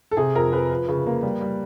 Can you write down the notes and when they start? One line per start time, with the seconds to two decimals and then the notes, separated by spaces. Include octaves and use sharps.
0.11 A4
0.17 C3 G#4
0.35 F2 A#4
0.53 F2 B4
0.71 F3
0.88 C#3
1.06 A#3
1.23 G3
1.41 G3